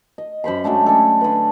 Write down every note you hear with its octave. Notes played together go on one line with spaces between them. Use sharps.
D#5
F#2 C5 B5 C6
F#3 G#3 A3 D4
C#4 D4 A4
D3 B4